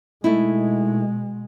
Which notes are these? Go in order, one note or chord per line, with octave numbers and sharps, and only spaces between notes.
B2 G#3 A3 D#4 E4